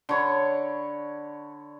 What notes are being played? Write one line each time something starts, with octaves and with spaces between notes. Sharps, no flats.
D3 C#5 B5